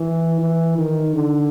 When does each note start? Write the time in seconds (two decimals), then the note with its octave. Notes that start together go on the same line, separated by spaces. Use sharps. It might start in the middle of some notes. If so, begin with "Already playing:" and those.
Already playing: E3
0.41 E3
0.78 D#3
1.15 D3